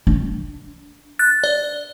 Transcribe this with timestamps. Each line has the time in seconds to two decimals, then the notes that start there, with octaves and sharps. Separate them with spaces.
0.07 D4
1.19 F#6 A6
1.44 D5